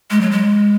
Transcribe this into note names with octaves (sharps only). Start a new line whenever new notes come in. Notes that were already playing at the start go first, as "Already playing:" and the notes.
G#3
F#3
G#3